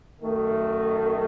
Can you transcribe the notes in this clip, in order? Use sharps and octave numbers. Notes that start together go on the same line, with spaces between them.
F#2 D#3 A3